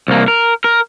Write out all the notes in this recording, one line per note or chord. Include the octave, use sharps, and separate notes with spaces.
C2 A#3
A#4
A#4